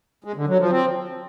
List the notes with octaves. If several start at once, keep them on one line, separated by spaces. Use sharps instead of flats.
G#3
D3
F#3
F3
C4